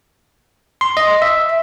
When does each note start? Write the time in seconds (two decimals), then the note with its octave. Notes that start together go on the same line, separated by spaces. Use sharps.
0.81 C6
0.97 D#5
1.22 E5